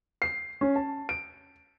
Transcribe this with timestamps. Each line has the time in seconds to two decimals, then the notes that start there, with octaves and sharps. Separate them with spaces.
0.22 C7
0.61 C#4
0.76 A5
1.09 D7